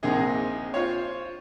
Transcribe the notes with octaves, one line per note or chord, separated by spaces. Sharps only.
A#1 C3 A#3 D#4 G#4 D#5
F4 C5 C#5